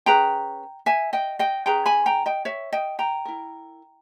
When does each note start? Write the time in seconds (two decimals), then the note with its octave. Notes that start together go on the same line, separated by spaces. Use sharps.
0.06 C#4 G#4 B4 G5 A#5
0.86 E5 G#5
1.13 D#5 G5
1.39 D#5 G5
1.66 C#4 G#4 B4 G5 A#5
1.86 G#5 B5
2.06 G5 A#5
2.26 D#5 G5
2.45 C#5 E5
2.73 D#5 G5
2.99 G5 A#5
3.25 E4 A#4